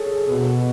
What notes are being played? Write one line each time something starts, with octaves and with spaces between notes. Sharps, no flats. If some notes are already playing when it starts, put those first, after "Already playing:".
Already playing: G#4 A4 C#5
B2 B4